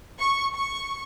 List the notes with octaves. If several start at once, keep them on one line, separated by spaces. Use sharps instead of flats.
C#6
C#6